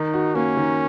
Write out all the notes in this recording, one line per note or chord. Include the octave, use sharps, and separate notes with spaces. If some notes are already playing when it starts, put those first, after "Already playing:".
Already playing: D#3 D#4
F#4
A#3 C#4
D#3